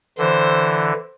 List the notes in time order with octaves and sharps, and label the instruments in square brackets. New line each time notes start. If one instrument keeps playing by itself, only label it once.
[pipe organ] D3 E3 [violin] C5